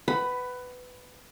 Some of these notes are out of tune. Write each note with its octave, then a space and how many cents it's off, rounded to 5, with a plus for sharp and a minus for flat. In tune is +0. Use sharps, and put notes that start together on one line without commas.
B4 +15 F#5 +20 B5 +0